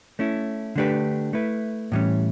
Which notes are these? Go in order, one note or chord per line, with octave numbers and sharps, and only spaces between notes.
A3 C#4 E4
D3 A3 D4 G4 B4
A3 E4 B4
A2 E3 G3 C#4